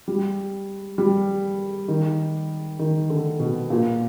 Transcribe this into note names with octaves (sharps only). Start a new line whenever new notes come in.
G3
G3
D#3
D#3
D3
B2
A#2